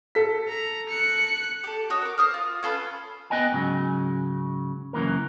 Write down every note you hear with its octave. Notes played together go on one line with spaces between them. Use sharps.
A4 B6
A#5
F#6 C#7
G4 A4
F#4 C#5 D#5
A#4 D6
C5 D#6 F6
F4
C#4 F4 A4 B4
B3 B4 D#5 G5 G#5
G#2 C#3 F#3
F#2 C#3 E3 A#3 A#4